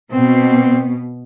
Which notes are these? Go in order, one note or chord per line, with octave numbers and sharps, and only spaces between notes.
B2 C4